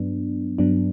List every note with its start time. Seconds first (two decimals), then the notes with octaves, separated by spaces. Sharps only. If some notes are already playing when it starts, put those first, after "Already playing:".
Already playing: G2 F#3 B3 D4
0.58 G2 F#3 B3 D4